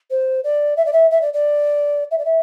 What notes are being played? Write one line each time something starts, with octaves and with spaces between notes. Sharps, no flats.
C5
D5
E5
D5
E5
E5
D5
D5
E5
D5
E5